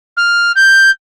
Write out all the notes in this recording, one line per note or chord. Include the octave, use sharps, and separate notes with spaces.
F6
G6